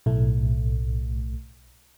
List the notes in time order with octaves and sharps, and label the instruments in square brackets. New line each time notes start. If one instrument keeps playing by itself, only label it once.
[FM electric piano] B1 A2 A3